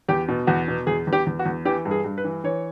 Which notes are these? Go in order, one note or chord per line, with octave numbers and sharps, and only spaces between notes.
E2 G4
B2
E2 F#4
B2
E2 G#4
E2
G4
E2
F#4
E2
E3 G4
G2
G#4
G2
B4
E3
E3 C#5